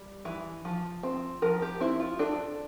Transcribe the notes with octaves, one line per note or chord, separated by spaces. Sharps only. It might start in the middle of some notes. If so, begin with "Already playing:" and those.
Already playing: G3
E3
F3
C4
F3 A#4
G4
C4 E4
F4
D4 A4